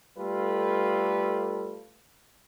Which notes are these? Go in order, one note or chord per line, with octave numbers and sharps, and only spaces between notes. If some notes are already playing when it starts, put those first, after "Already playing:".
G3 A3 F4 A4 B4